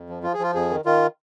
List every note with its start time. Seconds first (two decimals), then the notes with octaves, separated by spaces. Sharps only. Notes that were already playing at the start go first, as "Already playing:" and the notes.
Already playing: F2
0.09 F3
0.23 F3 F4
0.34 G#4
0.39 F3 F4
0.55 F2 G#4
0.70 D#3
0.85 D#3 F4